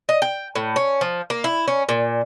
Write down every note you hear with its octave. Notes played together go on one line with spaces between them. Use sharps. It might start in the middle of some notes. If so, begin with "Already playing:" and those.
D#5
G5
A2
C#4
F3
A#3
E4
C#4
A#2